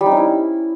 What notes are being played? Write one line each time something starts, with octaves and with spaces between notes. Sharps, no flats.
G3
D#4
C#4
E4